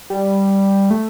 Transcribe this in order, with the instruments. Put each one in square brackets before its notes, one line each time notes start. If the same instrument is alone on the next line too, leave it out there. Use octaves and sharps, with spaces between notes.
[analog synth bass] G3
A3